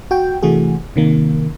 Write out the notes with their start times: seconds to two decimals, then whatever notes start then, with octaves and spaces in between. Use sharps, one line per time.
0.11 F#4 G5
0.42 C3 E3 A3 F#4 G#4
0.96 C3 D#3 A#3